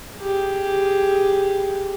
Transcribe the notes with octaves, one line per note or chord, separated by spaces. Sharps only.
G4 G#4